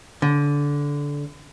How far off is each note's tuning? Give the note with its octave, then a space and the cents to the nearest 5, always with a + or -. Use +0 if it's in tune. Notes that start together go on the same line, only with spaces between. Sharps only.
D3 -20